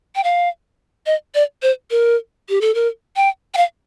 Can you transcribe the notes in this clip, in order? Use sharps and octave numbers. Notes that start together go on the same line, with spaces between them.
G5
F5
D#5
D5
C5
A#4
G4
A4
A#4
G5
G5
F5